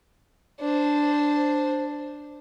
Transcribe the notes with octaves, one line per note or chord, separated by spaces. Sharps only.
D4 C5